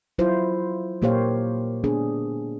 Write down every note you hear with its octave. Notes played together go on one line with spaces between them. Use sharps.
F#3 E4 F4 C5
A#2 A#3 G4 C5 C#5 F5
B3 D4 G#4